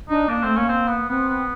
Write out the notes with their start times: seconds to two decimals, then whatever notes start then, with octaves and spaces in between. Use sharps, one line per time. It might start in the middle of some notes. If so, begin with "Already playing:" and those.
0.09 D4 D#4
0.29 A#3 D4
0.43 A3 C4
0.56 A#3 C#4
0.69 C4
0.88 B3
1.09 B3 C4
1.29 B3